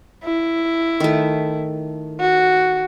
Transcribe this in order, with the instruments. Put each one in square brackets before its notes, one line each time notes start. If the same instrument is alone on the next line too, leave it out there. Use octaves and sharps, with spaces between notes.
[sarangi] E4
[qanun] D#3 A3
[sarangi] F#4